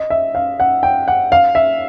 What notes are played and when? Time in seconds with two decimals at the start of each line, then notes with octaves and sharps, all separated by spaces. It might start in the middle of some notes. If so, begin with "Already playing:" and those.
Already playing: D#5
0.10 E5
0.35 F5
0.60 F#5
0.83 G5
1.08 F#5
1.32 F5
1.55 E5